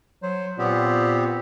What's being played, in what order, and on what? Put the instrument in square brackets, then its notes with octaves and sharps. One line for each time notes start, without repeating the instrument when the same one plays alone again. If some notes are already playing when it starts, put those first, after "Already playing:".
[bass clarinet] F#3 [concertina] C5
[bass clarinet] A#2 [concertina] B3 C4 G4